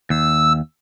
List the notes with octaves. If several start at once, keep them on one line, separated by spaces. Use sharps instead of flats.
D#2 E6